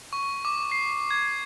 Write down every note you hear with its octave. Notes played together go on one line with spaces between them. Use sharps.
C#6
D6
C7
G#6